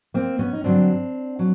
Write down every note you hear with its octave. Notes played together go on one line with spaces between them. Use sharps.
A#3 C4
B3 C#4
D#4
G2 D3 F#3 C4 D4
F#3